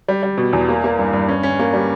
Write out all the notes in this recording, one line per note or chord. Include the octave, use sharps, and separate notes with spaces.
G3
G3
B2
E2
A#3
A#3
G2
G2
C#4
C#4
A#3
G3